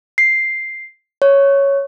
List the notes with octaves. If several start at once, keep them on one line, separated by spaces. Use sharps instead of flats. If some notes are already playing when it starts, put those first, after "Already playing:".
C7
C#5